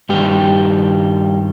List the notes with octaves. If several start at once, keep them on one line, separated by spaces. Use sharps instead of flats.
G2 D#3 G3 G4